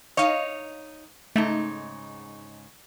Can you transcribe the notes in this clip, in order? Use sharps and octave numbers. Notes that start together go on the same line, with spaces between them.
D#4 C#5 D#5 F5
G#2 C#3 A3 D#4